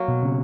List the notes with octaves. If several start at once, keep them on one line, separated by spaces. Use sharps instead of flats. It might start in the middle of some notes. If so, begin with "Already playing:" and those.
Already playing: F#3 A#3
B2
C#3